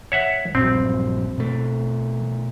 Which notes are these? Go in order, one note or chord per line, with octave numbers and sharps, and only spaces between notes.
C#5 E5 F#5
A#1 G2 F#3 C4
B2 A3